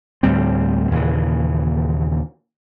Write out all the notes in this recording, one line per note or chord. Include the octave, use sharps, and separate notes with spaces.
D2 A2 G3 C4
D#2 A#2 C#3 E3